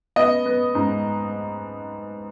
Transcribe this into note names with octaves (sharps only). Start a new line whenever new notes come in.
B3 D#5
B3
G#2